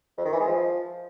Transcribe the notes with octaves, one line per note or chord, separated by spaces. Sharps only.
F2
D#3
E3
G#3
F3